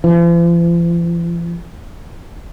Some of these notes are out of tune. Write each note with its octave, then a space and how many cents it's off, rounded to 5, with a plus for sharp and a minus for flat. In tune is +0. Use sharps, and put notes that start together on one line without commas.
F3 -45